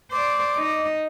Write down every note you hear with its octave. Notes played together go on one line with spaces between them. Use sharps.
C5 D5 D6
D#4 D#5